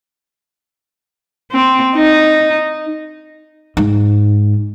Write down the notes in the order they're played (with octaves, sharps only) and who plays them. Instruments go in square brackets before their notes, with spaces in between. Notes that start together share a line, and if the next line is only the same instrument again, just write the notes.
[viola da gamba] C4
D#4
[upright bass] G#2